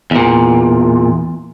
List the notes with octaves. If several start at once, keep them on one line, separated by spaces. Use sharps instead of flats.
E2 A#2